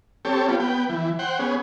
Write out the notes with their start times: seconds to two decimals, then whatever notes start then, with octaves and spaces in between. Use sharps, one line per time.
0.25 C4 G4 A4 C#5
0.48 B3 F4 G4
0.60 B3 G5
0.89 E3
1.19 C5 F#5 G5
1.39 B3 C#4 G#4